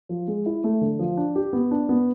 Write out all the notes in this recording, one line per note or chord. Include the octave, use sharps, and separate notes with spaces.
F3
G#3
E4
A3
D3
F3
D4
G4
B3
D4
B3